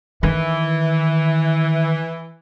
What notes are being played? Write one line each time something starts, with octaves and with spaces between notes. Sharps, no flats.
D#3 E3